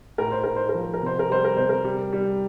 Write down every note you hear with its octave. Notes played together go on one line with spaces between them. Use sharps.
A2 A#4
C5
A2 A#4
C5
A#4
F3
C5
A#4
C3 C5
A#4
G3 C5
A#4
C3 C5
A#4
G3
G3